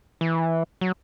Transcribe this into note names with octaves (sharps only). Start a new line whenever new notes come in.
E3
F#3